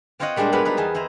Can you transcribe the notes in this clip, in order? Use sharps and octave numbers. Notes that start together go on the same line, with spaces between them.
C4 F4 C5 C#5 D#5 F#5
A#2 G3 G#3 D4 C5 D#5
F#3 G#3 B3 B4 F5
G3 D#4 B4
E2 G#4 A5
E4 C5 D#5 A#5